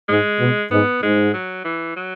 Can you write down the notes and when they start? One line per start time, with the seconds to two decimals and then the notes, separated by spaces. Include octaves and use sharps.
0.08 G#2 G#3
0.40 B2
0.71 G#2 B3
1.03 G#2 G#3
1.34 F#3
1.65 E3
1.97 F#3